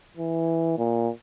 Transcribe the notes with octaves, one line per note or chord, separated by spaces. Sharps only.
E3
A#2